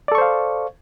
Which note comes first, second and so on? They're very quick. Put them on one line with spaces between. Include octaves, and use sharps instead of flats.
D5 A4 C#6 C5 F5